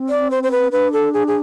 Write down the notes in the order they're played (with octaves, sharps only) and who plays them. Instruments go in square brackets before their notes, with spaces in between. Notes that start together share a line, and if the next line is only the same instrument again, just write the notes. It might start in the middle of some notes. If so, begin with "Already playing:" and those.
Already playing: [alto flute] C4
[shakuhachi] D5
C5
C5
B4
[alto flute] D4 [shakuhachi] B4
[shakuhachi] A4
G#4
G#4